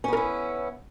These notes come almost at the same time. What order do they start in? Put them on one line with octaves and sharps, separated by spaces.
C#4 B3 A#4 E4